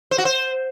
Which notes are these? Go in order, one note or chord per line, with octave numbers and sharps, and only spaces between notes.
C5
F#4
C5